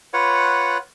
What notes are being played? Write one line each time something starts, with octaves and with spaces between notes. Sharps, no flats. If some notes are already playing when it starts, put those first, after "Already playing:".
F4 B4 C#5 F#5